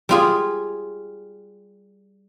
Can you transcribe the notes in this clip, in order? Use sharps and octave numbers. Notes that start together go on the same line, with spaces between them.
G3 F4 G#4